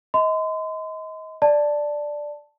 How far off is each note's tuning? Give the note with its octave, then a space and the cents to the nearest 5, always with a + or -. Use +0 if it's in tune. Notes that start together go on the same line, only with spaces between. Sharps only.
D#5 +30 C6 -40
D5 +0 A5 +0